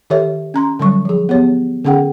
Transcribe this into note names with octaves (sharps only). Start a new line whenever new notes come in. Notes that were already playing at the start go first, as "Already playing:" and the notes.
D#3 G4 A4 C#5 E5
C#4 A#5 C6
D3 F#3 G3 C#6
F3 G#4
B3 G4 C#5
D3 C#4 G#4 F#5 G5